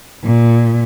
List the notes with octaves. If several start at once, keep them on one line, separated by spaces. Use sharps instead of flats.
A#2